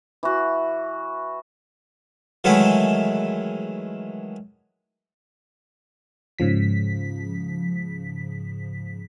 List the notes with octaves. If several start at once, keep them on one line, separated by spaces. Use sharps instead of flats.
E3 F#4
D#3 E3 F#3 G#3 A3 E4
G#2 C#3 F3 B6